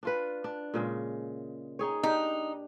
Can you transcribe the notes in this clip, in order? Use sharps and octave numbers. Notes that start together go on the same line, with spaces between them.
D4 F4 B4
D4
A#2 C#3 G#3
D#4 G#4 C#5
D4 D#4 G4